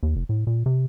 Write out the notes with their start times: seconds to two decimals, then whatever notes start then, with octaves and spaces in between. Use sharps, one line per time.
0.03 D#2
0.16 F1
0.29 A2
0.47 A#2
0.66 C3